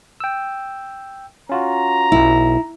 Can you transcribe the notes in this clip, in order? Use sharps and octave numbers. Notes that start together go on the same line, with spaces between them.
G5 E6
C#4 F4 F#4 A#5
B1 E4